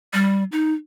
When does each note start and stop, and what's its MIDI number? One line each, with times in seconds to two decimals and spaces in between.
0.13 0.44 55
0.52 0.73 63